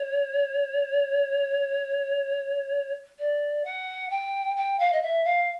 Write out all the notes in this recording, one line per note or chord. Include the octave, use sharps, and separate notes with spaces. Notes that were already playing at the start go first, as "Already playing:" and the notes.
Already playing: C#5
D5
F#5
G5
G5
F5
D#5
E5
F5